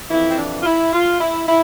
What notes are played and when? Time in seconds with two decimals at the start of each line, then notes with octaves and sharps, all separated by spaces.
0.10 F2 E3 E4
0.28 C4
0.38 D4
0.59 F4
0.65 E4
0.93 F4
1.20 E4
1.48 E4